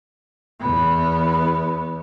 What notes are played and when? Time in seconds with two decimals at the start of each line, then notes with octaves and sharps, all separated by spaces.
0.60 E2 B3